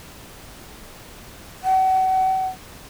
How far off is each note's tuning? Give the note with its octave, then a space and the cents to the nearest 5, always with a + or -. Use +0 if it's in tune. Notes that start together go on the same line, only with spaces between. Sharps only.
F#5 +35